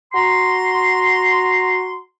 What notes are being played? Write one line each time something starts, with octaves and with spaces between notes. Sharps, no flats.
F#4 A#5 C6